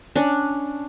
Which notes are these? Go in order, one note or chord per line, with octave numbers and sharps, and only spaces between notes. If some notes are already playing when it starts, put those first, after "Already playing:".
C#4 D4